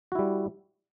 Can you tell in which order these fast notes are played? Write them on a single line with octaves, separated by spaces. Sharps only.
F#4 E4 G3